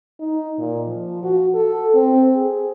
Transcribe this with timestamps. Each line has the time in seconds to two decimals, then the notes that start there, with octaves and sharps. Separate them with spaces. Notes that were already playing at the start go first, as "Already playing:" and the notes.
0.20 D#4
0.58 A#2
0.87 F3
1.23 F#4
1.55 A4
1.94 C4
2.35 G#4